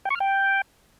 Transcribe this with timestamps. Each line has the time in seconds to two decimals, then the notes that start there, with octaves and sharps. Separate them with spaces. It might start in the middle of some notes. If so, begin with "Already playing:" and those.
0.05 G5
0.10 C#6
0.15 F6
0.20 G5